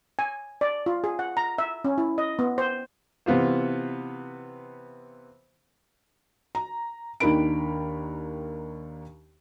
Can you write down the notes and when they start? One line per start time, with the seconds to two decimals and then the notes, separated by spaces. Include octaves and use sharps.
0.19 G#5
0.61 D5
0.86 F4
1.04 G#4
1.19 F#5
1.37 A#5
1.58 E5
1.84 C#4
1.98 E4
2.18 D#5
2.39 B3
2.58 C5
3.26 C3 E3 B3 F4 C5
6.55 A#5
7.20 D#2 D#3 D4 A#4 B5 D7